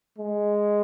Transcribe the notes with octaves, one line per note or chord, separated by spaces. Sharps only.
G#3